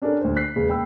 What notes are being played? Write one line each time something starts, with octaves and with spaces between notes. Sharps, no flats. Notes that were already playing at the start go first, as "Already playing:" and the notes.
C#4 D4 G4 A4 A#4 D5
D2 C5
F#6 B6 C7
E1 C#3 C#4 B4
D#2 G5 B5 E6